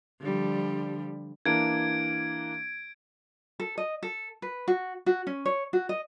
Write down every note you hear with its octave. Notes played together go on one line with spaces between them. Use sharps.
D3 F3 G3
E3 A#3 D4 G#6 D7
A4
D#5
A4
B4
F#4
F#4
C#4
C#5
F#4
D#5